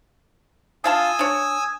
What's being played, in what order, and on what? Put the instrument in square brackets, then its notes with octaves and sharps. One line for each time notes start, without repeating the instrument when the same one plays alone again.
[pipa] D4 F4 A5 [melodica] G#5 D#6 E6
[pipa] D4 C#5